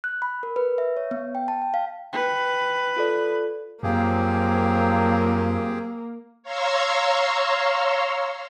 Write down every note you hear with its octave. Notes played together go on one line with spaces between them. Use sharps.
F#6
B5
A#4
B4
E5
C#5
B3
G5
A5
G5
F5
B4 G5
F4 A4 D5
F#2 F3 F#3 A#3 C4 G4 G#4
C#5 F5 A#5 C6 C#6 E6